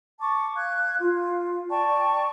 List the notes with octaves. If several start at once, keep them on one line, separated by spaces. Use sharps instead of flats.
A5 C#6 D6
F5 F#6 G#6
F4 F5
D5 G5 A5 C#6